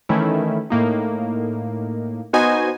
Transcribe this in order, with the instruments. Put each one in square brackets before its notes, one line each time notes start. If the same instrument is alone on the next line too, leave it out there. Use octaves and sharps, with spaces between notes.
[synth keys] D#3 E3 A3 C#4 E4
A2 A#3 D#4
B3 D#4 F#4 C5 D#5 G#5